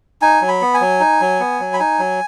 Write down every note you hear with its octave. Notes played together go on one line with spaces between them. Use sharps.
D#4 G#5
F#3
B5
B3
G#5
F#3
D#4
F#3
B3
F#3
B5
D#4 G#5
F#3